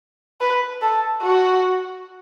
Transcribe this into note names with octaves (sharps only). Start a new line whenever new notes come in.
B4
A4
F#4